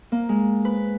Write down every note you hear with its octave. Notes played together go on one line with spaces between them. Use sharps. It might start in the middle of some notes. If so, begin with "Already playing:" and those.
A#3
G#3
B4